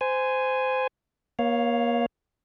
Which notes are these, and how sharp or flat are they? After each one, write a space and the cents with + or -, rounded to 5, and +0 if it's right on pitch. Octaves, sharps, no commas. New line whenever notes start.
C5 -20 G#5 +0
A#3 +35 C#5 +0 F5 +0